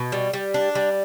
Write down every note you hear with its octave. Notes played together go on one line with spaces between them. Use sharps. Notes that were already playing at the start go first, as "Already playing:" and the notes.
Already playing: B2
G3
G3
D4
G3